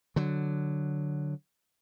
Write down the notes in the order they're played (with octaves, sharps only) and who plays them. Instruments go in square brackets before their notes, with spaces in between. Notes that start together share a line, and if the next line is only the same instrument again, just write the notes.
[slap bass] D3 F#3